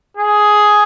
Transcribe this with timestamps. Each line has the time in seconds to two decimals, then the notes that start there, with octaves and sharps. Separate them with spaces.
0.17 G#4